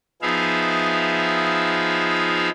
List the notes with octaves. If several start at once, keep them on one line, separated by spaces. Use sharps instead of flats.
F3 B3 D#4 G#4 E5 F5